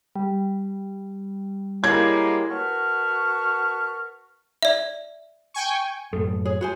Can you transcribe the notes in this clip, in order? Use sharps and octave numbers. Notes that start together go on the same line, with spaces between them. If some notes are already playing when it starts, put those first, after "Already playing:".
G3
G3 G#3 A#3 E4 C#5 G#6
F#4 A#4 B4 A5 C#6 F6
D5 E5
G5 G#5 C#6
F#2 A2 A4
G#4 C#5
F#4 C5 G#5